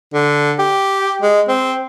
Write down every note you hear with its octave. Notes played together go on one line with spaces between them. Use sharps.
D3
G4
G#3
C4